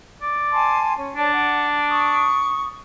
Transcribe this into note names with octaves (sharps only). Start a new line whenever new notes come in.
D5
G#5 A5 C6
C#4
D4 C#5 D5 A5
F#5
C#6 D#6